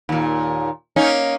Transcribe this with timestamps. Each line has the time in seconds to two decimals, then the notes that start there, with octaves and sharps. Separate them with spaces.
0.09 D#2 A#2
0.96 A#3 C#4 D#4